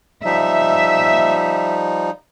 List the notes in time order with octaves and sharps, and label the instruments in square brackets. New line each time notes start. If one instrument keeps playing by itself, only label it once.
[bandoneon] F3 G3 D#4 [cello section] E5